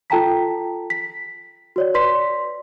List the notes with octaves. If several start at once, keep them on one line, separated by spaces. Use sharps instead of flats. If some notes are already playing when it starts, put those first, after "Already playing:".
F4 A4 G5 A5 A#5 B6
B6
F#4 C#5 D5
B4 D5 C6 B6